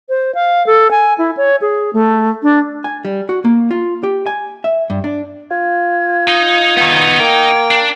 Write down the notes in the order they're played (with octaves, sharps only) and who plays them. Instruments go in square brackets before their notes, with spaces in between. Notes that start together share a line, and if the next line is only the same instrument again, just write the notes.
[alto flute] C5
F5
A4
G#5
E4
C#5
G#4
A3
D4
[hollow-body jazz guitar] G#5
G3
F#4
A#3
F4
G4
G#5
E5
G2
D4
[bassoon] F4 [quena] G#6
[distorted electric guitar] D#4 D#5
[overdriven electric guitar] D#3 B3
[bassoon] A#3 [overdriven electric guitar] G5
[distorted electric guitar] D4